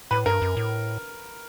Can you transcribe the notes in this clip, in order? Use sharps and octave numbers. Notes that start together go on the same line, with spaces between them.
A2 B4
G2 A#4
F#2
A2